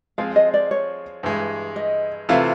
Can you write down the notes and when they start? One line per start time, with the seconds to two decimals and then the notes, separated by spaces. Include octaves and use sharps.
0.18 F3 G#3 C4 F4 F5
0.36 D#5
0.54 D5
0.71 C#5
1.23 G2 E3 G#3
1.76 D#5
2.29 C3 E3 A3 C4 F4 F5